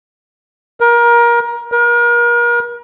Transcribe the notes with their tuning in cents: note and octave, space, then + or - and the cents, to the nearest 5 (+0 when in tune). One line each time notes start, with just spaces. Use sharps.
A#4 +25
A#4 +35